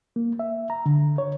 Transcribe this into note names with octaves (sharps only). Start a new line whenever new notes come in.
A#3
E5
A#5
D3
C#5